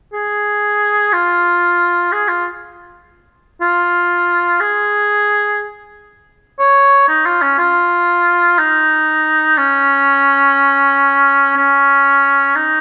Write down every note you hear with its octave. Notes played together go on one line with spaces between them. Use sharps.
G#4
F4
G#4
F4
F4
G#4
C#5
D#4
F4
C#4
F4
D#4
C#4
C#4
D#4